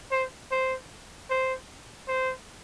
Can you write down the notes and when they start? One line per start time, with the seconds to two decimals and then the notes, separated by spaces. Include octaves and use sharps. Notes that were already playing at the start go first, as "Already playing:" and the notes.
0.11 C5
0.51 C5
1.30 C5
2.08 C5